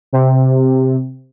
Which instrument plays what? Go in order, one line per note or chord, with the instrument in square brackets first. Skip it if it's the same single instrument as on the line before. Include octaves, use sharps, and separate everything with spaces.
[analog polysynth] C3